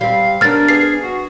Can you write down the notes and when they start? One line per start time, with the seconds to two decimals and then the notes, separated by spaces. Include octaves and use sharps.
0.01 G3 C4 F5
0.41 B3 D4 A#4 F6 A6
0.68 G#4 B4 C7
1.03 F#4